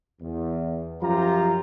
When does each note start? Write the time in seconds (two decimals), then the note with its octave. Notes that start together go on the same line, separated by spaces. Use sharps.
0.21 E2
1.02 F#2 F3 F4 G4 A#5